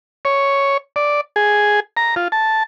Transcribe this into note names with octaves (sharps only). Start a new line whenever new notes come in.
C#5
D5
G#4
A#5
F4
A5